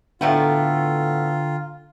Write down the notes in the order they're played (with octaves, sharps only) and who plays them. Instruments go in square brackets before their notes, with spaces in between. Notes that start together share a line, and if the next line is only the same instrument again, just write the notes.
[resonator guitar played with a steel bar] A2 A3 B3 [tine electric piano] D3 G5 A#5 [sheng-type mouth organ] F4